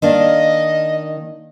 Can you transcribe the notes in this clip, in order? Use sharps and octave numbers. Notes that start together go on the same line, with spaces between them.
D#3 A#3 D4 D#5